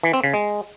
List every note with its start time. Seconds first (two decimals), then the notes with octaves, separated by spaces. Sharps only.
0.03 E3
0.13 C4
0.24 C#3
0.34 G#3